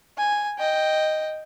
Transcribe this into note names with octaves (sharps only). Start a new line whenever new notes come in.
G#5
D#5 G5